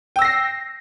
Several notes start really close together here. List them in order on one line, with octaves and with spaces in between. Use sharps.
G5 E6 A#6 C7